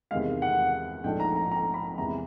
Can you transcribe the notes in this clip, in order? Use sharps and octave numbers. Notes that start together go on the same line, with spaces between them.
E2 C3 D#3 G#3 F5
F#5
A#1 G#2 F3 A3 D4 G5
A#5
A#5
A#5
B5
E2 C3 E3 G#3 A#5